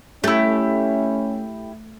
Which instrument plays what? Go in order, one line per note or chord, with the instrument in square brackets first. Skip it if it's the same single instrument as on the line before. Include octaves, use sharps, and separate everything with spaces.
[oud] A3 [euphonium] C#4 [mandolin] E4 G4